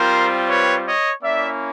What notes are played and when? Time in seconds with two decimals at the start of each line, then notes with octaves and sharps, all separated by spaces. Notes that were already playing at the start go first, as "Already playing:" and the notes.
Already playing: G3 C4 F4 A#4 C5
0.48 B4 C#5
0.85 C#5 D#5
1.21 A#3 C#4 E4 D5 E5